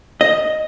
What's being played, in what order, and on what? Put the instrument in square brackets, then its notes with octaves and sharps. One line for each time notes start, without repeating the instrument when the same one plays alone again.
[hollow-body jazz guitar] D#5